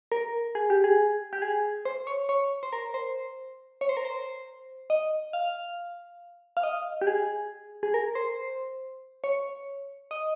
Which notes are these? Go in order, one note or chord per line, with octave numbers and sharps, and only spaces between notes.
A#4
G#4
G4
G#4
G4
G#4
C5
C#5
C#5
C5
A#4
C5
C#5
C5
A#4
C5
D#5
F5
F5
D#5
G4
G#4
G#4
A#4
C5
C#5
D#5